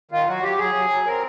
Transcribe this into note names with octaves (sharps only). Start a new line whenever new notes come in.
D#3 F4
F#3 F#4
F#3 G4
F#3 G#4
F#3
F#3
C4 A#4